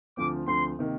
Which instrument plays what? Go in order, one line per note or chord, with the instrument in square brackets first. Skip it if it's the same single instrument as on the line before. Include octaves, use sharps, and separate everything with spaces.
[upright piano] D2 D3 F3 C4 [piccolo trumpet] D6
[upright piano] D2 D3 F3 C4 [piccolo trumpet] C6
[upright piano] C3 D#3 A#3